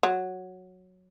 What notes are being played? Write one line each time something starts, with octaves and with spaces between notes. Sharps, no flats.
F#3